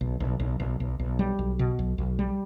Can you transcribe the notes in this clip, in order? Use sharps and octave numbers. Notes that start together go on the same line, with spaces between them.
B1
B1
B1
B1
B1
B1
G3
B1
B2
B1
B1
G3